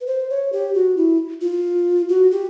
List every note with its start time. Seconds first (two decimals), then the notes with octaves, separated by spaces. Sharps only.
0.01 B4
0.07 C5
0.30 C#5
0.53 G4
0.75 F#4
0.97 E4
1.41 F4
2.09 F#4
2.31 G4